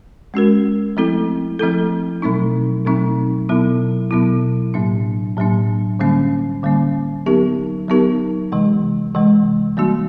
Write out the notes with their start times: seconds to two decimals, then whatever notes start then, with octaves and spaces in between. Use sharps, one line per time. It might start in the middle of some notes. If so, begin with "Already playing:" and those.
0.34 G#3 C#4 F#4 A#4
0.97 F3 A3 C4 E4 A4
1.59 F3 A3 C4 E4 A4
2.22 B2 F#3 A3 C4 D#4
2.85 B2 F#3 A3 C4 D#4
3.49 B2 F#3 B3 E4
4.11 B2 F#3 B3 E4
4.74 A2 F#3 A#3 D4
5.37 A2 F#3 A#3 D4
5.99 D3 G3 A#3 C#4
6.63 D3 G3 A#3 C#4
7.26 F#3 B3 D#4 G4 A#4
7.88 F#3 B3 D#4 G4 A#4
8.52 C3 E3 G#3
9.15 C3 E3 G#3
9.77 E3 G3 A#3 D4 F#4